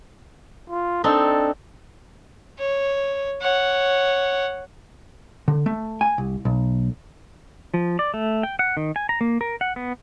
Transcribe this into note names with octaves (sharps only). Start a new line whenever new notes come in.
F4
C4 D4 D#4 A4
C#5
C#5 F#5
D3
A3
G#5
C2
B1
F3
D5
A3
G5
F#5
D#3
G#5
A#5
A#3
A#4
F#5
B3